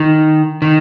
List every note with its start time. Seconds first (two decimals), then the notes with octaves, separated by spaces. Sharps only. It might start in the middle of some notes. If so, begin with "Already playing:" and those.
Already playing: D#3
0.62 D#3